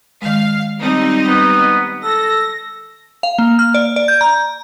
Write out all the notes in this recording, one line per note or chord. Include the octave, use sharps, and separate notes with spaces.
D#3 G#3 F5
G3 C4 D#4
B3
A4 A#6
F5
A#3
F6
D5
D5
G6
A#5